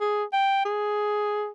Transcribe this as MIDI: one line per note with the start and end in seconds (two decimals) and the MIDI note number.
0.01 0.24 68
0.33 0.62 79
0.65 1.49 68